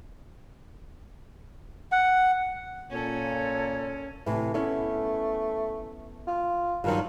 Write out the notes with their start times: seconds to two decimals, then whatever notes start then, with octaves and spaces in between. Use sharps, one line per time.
1.92 F#5
2.91 A#2 C#4 A4 C#5 G#6
4.26 A2 C3 E3
4.54 A3 B3 C#4 E4
6.27 F4
6.84 G2 D#3 F#3 F4